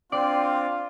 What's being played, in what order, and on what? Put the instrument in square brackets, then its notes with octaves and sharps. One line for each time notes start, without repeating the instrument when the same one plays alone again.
[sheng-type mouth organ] C4 D4 [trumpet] F4 [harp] D5 C7 [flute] G5